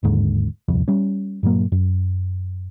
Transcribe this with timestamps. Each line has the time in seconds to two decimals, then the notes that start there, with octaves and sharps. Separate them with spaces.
0.03 G1 D#2 G#2 D3
0.68 D#1 C2 F2
0.88 G3 C#4
1.43 G2 A#2 F#3 A#3
1.72 F#2